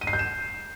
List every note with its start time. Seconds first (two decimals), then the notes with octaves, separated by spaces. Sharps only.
0.01 D#7
0.07 C7
0.13 G6
0.19 E7